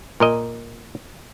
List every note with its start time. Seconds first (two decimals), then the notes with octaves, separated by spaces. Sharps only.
0.20 A#2 A#4 D#5